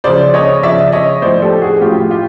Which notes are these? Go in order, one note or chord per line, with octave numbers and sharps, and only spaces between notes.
C#3 F3 C5 D5
C#5 D#5
C#3 F3 D5 E5
C#5 D#5
A2 F3 C5 D5
G4 A4
F#4 G#4
A2 F3 F4 G4
F4 G4